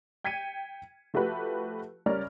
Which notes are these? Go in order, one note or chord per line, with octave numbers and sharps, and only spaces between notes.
G5 G#6 B6 C#7 D#7
F3 A3 F#4 G4 B4
C#2 G3 C#4 A#4 D5 F6